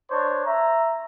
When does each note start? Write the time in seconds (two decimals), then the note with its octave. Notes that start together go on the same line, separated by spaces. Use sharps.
0.10 D4 C5 C#5
0.44 E5 A#5